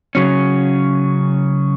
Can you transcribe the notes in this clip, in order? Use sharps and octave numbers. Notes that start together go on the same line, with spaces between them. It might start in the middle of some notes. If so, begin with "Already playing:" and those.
C#3 F#3 C#4